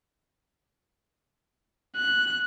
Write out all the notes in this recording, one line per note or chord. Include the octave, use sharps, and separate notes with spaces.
F#6